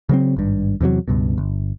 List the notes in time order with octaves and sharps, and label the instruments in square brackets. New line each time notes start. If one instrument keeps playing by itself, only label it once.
[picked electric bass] C#3 F#3 A#3 C4
G#1 G2
E2 C3 D#3 F#3
C#2 G2 B2
G1